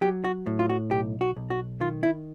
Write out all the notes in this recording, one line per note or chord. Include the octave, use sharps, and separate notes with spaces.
F#3 G4
F#4
A2
F4
F#4
B1 G4
F#4
B1
F#4
D#3 F4
E4